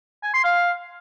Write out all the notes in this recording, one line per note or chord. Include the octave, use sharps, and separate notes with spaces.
G#5
C6
F5